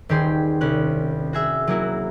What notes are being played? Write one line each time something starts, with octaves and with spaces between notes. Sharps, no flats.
D#1 D#3 G4 G#4 C6
C2 C#4 F#6
F#4 G#4 E5
F#3 A#3 E4 F#4